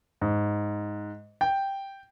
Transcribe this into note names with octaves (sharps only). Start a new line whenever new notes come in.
G#2
G5